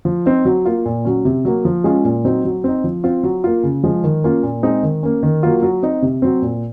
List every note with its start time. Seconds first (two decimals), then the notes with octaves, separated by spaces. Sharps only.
0.05 F3
0.26 C4 D#4
0.45 F#3
0.65 A#3 F4
0.85 A#2
1.05 F#3 C#4
1.25 C3
1.45 F#3 A#3
1.65 F3
1.84 G#3 C#4 F4
2.05 A#2
2.25 F#3 C4 D#4
2.45 F#3
2.64 C4 D#4
2.84 F3
3.04 C4 F4
3.23 F#3
3.44 A#3 F4
3.63 C#3
3.84 F3 G#3
4.04 D#3
4.24 A#3 C#4 F4
4.43 A#2
4.63 G#3 C4 D#4
4.83 D#3
5.03 A#3 C#4
5.23 D#3
5.43 F#3 A#3 F4
5.63 F#3
5.83 C4 D#4
6.02 C3
6.22 F#3 C4
6.42 A#2